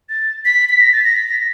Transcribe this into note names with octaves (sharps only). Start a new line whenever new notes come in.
A6
B6
B6
A#6
A6
A#6
B6
A#6